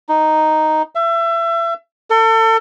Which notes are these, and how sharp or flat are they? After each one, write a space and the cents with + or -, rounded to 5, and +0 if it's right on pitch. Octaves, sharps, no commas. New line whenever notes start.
D#4 -5
E5 +30
A4 +35